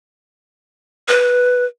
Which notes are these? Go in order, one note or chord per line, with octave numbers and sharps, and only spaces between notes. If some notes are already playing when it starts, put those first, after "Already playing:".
B4